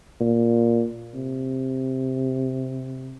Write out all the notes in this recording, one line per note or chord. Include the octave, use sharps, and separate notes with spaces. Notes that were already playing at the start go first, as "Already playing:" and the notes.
A#2
C3